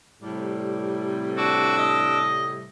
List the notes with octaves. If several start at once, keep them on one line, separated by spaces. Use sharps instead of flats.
A2 C3 G3
D4 F#4 D6 E6
D#5